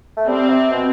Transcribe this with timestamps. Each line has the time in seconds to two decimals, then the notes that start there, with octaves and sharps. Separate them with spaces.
0.17 A3
0.27 G3 C4
0.49 C3
0.72 B2